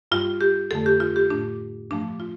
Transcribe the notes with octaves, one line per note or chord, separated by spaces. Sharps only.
G2 G3 F4
G4
F2 D3 A3 A4
G4
F4
G4
A2 A3 D4
G2 F3 A3 D4
F4